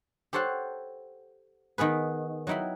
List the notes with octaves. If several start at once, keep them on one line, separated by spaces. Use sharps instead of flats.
G4 A4 C5 C#5 F#5
D#3 B3 G#4 B4
F#3 D#4 E4 G5 B5